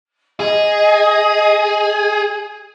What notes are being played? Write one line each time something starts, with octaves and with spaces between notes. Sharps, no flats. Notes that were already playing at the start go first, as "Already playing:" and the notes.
G#4 D#5